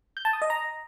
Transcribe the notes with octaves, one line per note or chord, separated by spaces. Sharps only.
G6
A5
D#6
D#5
A#5